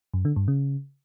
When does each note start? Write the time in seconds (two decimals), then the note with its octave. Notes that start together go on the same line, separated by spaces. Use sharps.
0.14 F#2
0.25 D3
0.36 G2
0.48 C#3